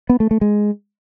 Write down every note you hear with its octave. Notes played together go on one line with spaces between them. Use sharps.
B3
A3
A3
G#3